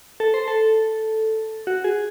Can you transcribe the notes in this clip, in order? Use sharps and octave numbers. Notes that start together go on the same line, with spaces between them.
A4
C5
A4
F#4
G#4